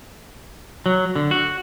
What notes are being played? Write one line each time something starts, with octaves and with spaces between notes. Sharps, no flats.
F#3
D3
F#4